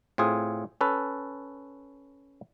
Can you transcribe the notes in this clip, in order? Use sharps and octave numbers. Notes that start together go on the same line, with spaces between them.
A2 C4 F4 G#4
C#4 A4 B4